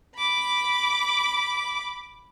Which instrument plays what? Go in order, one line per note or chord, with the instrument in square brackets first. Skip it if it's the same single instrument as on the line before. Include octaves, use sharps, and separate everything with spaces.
[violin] B5 D6